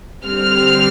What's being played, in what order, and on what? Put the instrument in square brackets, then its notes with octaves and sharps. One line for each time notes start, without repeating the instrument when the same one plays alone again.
[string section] D3 G3 C4 F6